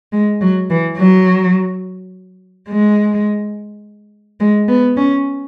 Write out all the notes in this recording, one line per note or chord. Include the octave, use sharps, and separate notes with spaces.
G#3
F#3
E3
F#3
G#3
G#3
B3
C#4